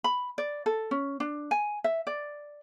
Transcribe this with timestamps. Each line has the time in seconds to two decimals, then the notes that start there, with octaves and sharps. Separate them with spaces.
0.04 B5
0.38 D5
0.66 A4
0.91 C#4
1.20 D4
1.51 G#5
1.84 E5
2.07 D5